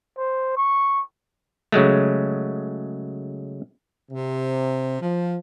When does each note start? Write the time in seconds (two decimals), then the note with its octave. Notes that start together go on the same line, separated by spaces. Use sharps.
0.18 C5
0.57 C#6
1.72 C#3 F#3 G#3 A3
4.11 C3
5.02 F3